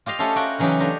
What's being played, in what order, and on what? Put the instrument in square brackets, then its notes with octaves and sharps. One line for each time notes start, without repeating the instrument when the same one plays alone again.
[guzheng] F4 G4 D#5 F5
A3 C#4 G4 A4 C5 C#5
F4 F#4 A#4 C#5 G5
C#3 E3 F#3 C#4 D#4 G4
A3 D4 C5 D#5 F5